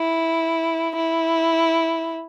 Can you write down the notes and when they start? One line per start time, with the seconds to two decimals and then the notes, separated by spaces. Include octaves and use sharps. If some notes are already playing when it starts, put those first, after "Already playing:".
Already playing: E4
0.96 E4